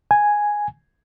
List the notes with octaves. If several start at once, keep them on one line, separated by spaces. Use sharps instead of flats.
G#5